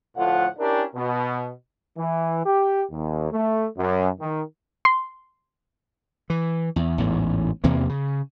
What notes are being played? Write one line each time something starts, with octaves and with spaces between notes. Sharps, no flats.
D2 A2 F3 A3 F4 F#5
C#4 D4 E4 G4 A#4
B2
E3
G4
D#2
A3
F#2
D#3
C6
E3
E2
A1 E2 G#2
E2 C3 E3 A#3
C#3